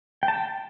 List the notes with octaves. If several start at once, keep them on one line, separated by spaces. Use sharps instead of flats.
G5
A5
G5